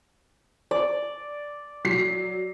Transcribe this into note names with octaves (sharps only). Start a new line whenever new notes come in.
D5
F#3 B6 C7